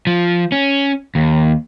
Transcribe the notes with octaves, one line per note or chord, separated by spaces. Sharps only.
F3
C#4
D#2